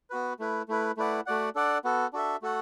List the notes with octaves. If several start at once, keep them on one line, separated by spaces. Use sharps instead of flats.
B3 F#4 B4
A3 E4 B4
A3 E4 B4
A3 E4 B4 D5 F#5
A3 F#4 D5 F#5
D4 A4 D5 F#5
B3 F#4 A4
D4 F#4 A4 E5
A3 F#4 A4 F#5